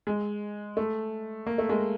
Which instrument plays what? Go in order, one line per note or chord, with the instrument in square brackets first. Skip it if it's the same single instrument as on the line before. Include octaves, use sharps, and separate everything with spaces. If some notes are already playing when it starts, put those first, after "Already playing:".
[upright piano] G#3
A3
A#3
A3
G#3 A#3